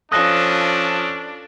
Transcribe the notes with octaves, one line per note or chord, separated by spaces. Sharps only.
F3 C#4 D4 A4 D#6 F#6 A#6